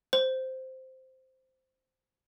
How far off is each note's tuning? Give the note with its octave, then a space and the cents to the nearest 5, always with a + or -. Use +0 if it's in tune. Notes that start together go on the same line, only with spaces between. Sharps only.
C5 -5